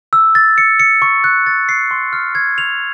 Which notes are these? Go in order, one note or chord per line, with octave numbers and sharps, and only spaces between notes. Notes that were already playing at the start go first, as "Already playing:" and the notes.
E6
A6
C#7
C#7
C#6
F#6
A6
C7
C6
F6
G#6
F7